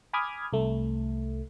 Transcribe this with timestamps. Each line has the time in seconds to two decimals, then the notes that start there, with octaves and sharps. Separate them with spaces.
0.13 G#5 B5 D6 D#6 F6 G#6
0.53 C2 A3